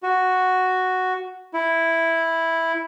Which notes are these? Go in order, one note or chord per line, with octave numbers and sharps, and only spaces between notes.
F#4
E4